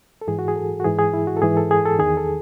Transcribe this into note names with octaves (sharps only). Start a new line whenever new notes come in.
A4
G#2 E3 G#4
F#4
G#4
A4
F#4
G#2 E3 G#4
G#4
E4
F#4
A4
G#2 E3 G#4
A4
G#4
A4
E2 D#3 G#4
A4